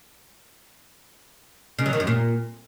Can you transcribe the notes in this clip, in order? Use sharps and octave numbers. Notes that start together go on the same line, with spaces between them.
C#3
F#3
D#3
F#2
A#2